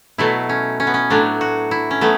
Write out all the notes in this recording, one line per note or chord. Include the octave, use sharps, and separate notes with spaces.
B2 F#3 A3 E4
C#4
C#4
B3
C#4
A2 F#3 A3 D4
F#4
E4
C#4
F#3 A3 B3